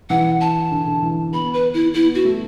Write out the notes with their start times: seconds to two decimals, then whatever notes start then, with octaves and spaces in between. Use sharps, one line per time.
0.10 E3 F#5
0.41 A5
0.71 D3
0.87 D3
1.03 E3
1.33 B3 B5
1.54 B4
1.74 E4
1.94 B3 E4
2.15 F#4
2.25 A3